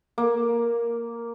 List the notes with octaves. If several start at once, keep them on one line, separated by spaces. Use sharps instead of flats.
A#3